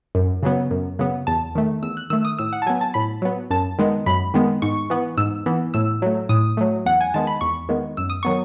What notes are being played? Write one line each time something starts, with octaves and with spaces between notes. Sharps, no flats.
F#2
C#3 F#3 B3
F#2
C#3 F#3 B3
E2 A5
D#3 A3
E2 E6
F#6
D#3 A3 E6
D#6
A2 E6
F#5
A5
F#3 B3 G#5
A5
A2 B5
F#3 B3
F#2 A5
D#3 G#3 B3
F#2 B5
D#3 G#3 B3
G#2 C#6
E3 B3
G#2 E6
E3 B3
A2 E6
F#3 A3
A2 D#6
F#3 A3
E2 F#5
G#5
D#3 G#3 B3 A5
B5
E2 C#6
D#3 G#3 B3
F#2 E6
D#6
D#3 F#3 B3 C#6